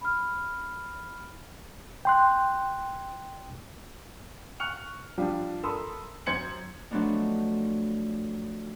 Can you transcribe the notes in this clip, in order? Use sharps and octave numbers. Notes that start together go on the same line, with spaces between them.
B5 F6
G5 C6 F#6
C#6 F6 F#6 C#7 F7
F3 G3 D4 F4
A4 A#4 B5 C6 D#6 E6
F#2 C5 G#6 C#7 F#7
F3 F#3 A3 B3 D4 D#4